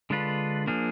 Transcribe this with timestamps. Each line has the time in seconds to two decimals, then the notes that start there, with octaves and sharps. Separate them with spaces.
0.10 D3 G#3 D4 F4 B4
0.67 F3 A#3 D4 G#4